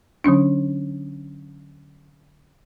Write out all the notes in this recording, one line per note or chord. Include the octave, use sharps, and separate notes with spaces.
D3 F#3 C#4 D4